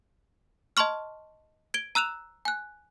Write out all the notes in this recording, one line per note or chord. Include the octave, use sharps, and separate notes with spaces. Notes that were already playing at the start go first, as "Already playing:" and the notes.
D#5 A5 C6 C#6 F6
G#6 D7 G7
A#5 E6 F#6 E7 F7
G#5 F#6